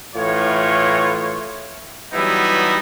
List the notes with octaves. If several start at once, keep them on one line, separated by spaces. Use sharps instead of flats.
A2 E3 F4 C#5
E3 F#3 G3 B3 D#4 E4